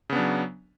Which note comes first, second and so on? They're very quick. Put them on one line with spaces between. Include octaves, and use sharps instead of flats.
C#3 B3 D4 F#3